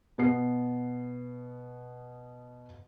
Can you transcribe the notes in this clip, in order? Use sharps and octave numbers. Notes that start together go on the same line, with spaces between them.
B2 B3 C7